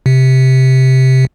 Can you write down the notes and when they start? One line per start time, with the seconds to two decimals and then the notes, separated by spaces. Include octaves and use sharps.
0.06 C3